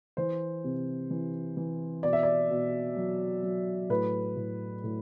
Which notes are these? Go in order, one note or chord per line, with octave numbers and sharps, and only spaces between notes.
E3 C5
C3
E3
E3
B2 D5
E5
D5
B2
F#3
F#3
A2 B4
A2
A2